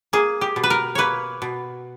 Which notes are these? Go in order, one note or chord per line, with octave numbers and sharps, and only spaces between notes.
A#3 G#4
G4
B2
B4
A#4
A#3 B4 C#5
B2